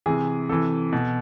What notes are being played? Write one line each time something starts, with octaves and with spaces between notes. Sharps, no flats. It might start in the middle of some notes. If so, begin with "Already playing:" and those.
C3 E3 G#4
C3 E3 A4
B2